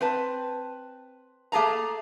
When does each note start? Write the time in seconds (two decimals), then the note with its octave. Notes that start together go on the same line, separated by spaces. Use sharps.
0.01 C4 B4 A5
1.52 A3 A#3 G#4 A5 A#5